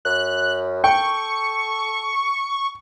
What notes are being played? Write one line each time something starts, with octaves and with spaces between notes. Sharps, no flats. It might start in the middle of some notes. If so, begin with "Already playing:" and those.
F#2 F#6
A4 G5 C#6